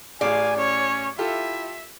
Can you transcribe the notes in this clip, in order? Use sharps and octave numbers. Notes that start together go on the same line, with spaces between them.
A1 G#4 D5 F5 G#5
C#4 C#5
E4 F4 G4 A4 E5